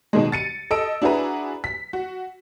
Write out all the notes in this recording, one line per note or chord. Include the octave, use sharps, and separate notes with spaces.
B2 D#3 G#3
A6 C#7 D#7
A4 D#5 E6 D7
D4 E4 F#4 G#4 B4 A#5
B6
F#4